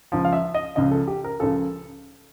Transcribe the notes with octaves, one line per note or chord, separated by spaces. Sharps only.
C#2 C#3 F3
F5
E5
D#5
C#2 C#3 F3 D#5
A4
G4
A#4
C#2 C#3 F3 A4